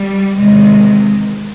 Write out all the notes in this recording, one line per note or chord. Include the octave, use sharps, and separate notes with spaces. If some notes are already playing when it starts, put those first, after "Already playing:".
Already playing: G3
E2 C3 D#3 G#3